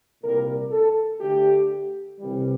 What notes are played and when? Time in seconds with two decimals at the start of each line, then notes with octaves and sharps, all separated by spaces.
0.22 C2 A#2 G3 A#4
0.71 A4
1.20 D2 D3 A3 G4
2.19 C2 C3 E3 G3